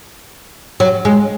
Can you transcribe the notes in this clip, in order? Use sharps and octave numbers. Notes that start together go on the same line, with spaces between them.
F#3
G#3